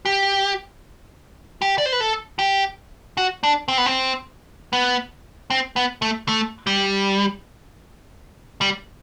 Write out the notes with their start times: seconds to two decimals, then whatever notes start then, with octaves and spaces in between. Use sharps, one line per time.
0.06 G4
1.62 G4
1.78 D5
1.86 C5
1.92 B4
2.00 A4
2.39 G4
3.17 F#4
3.43 D4
3.68 C4
3.78 B3
3.86 C4
4.73 B3
5.50 C4
5.76 B3
6.02 A3
6.28 A3
6.67 G3
8.61 G3